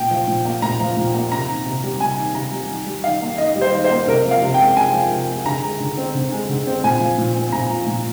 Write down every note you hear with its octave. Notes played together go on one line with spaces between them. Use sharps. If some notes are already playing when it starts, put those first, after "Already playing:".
Already playing: A#2 G5
F3
A#2
A#3
A#2 A#5
F3
A#2
A#3
C3 A#5
D#3
C3
G3
C3 G#5
D#3
C3 A#5
G3
D#3
G3
D#3 F5
A#3
D#3 D#5
G3
C5
D#3
C5
A#3
C3 A#4
F3
F5
C3
G5
G#3
C3 G#5
F3
C3
G#3
D3 A#5
G#3
D3
C4
D3
G#3
D3
C4
A#2 G#5
F3
A#2
C4
A#2 A#5
F3
A#2